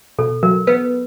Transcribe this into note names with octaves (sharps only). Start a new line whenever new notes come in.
B2 A4
F#3 A#4
B3 B4